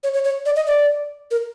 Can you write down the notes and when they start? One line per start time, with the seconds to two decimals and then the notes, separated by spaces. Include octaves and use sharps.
0.03 C#5
0.14 C#5
0.25 C#5
0.46 D5
0.56 D#5
0.67 D5
1.31 A#4